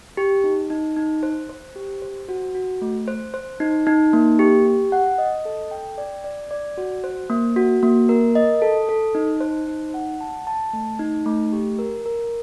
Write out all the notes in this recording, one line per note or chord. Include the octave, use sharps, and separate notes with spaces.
G4
D#4
D#4
D#4
C5
C5
G4
C5
F#4
F#4
A3
C5
C5
D#4
D#4
A#3
G4
G4
F#5
D#5
A4
G5
D5
D5
D5
F#4
C5
A#3
F#4
A#3
A#4
D#5
A4
A4
D#4
C5
D#4
F#5
A5
A5
A3
D#4
A3
G4
A#4
A#4